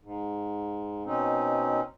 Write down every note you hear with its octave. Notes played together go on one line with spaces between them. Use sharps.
G#2
B2 C4 C#4 D#4